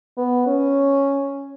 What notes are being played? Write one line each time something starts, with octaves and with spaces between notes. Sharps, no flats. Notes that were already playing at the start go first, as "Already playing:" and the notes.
B3
C#4